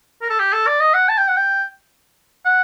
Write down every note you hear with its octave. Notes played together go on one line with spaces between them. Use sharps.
A#4
A4
G4
A4
D5
D#5
F#5
A5
G5
F#5
G5
F#5